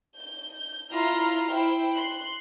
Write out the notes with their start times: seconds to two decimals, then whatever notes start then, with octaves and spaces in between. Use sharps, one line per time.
0.17 G6
0.93 E4 F4 A#5 C6 F6
1.52 E4 C5 G5
1.95 C6 F#6